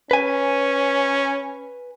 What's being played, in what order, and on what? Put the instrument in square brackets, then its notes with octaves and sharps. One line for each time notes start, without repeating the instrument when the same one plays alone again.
[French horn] C#4 [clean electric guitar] B4 G#5